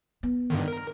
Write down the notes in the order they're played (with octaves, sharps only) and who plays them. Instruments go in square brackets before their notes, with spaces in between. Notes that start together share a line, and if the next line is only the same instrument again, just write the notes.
[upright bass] B3
[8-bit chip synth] G2 D3 D#3
A#4